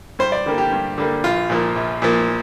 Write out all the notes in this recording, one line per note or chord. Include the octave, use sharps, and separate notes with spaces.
G2 C5
D5
D3 G3 A#3
G4
G2
D3 G3 A#3
A#1 F4
A#2 F3 A#3
A#1
A#2 F3 A#3